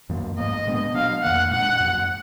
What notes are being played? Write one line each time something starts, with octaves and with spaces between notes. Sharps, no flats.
F#2 D#3 A#3
G#2 F3 A#3 D#5
A#2 G#3 B3 D4
B2 F#3 B3 D4 F5
F2 D#3 A#3 F#5
A#2 G#3 B3 D4 F#5
F#2 F3 A#3